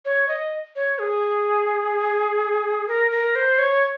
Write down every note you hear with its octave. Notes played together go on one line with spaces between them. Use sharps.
C#5
D#5
C#5
G#4
A#4
A#4
C5
C#5